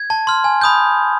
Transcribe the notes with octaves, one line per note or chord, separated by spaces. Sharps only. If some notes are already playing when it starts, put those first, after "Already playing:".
Already playing: G#6
A5
C6 F6
G#5
B5 D#6 G6